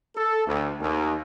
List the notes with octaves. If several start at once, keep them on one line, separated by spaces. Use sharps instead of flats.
A4
D2
D#2